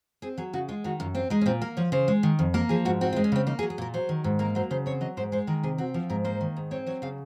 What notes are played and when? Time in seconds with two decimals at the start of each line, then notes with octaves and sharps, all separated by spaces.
0.22 C4 G#4
0.38 F#3 G#4
0.53 C#3 F#4
0.69 G#3 F4
0.84 D#3 F#4
1.00 F#2 F4
1.15 C4 F4
1.30 G#3 D#4
1.41 C#4
1.46 A#2 C4
1.62 A#3 A#4
1.77 F3 C#5
1.92 C#3 C5
2.08 G#3
2.23 D#3
2.39 F2
2.54 A#3 A#4
2.69 F3 G#4
2.85 G#2 F#4
3.01 C4 F#4
3.13 F4
3.16 G#3
3.24 C#4
3.32 C#3 C4
3.47 A#3 D#4
3.59 G#4
3.63 F#3
3.70 G#4
3.78 A#2 A#4
3.94 F#3 C5
4.09 D#3
4.24 G#2
4.39 A#3 A#4
4.55 F#3 C5
4.71 C#3 C5
4.86 C4 C#5
5.01 F#3 D#5
5.17 G#2 C5
5.32 G#3 C5
5.47 D#3 A#4
5.63 C3 G#4
5.78 C4 F#4
5.94 F3 F4
6.10 G#2 A#4
6.24 A#3 C5
6.41 D#3
6.57 G#2
6.71 C4 C#5
6.87 F#3 C#5
7.02 C#3 F5